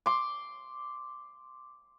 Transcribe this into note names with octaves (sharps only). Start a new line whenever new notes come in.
C6 D6